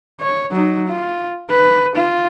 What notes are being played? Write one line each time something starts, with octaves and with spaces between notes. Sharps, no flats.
C#5
F#3 D#4
F4
B4
F4